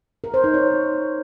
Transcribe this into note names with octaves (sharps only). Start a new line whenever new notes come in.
A#4
C5
D#4
C#5